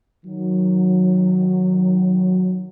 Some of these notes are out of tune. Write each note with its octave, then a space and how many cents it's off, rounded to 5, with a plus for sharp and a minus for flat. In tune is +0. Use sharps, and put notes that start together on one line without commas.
D#3 +0 F#3 -10